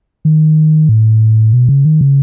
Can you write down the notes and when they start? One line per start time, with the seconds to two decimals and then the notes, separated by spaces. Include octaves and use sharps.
0.25 D#3
0.89 A2
1.53 B2
1.69 C#3
1.85 D#3
2.01 C#3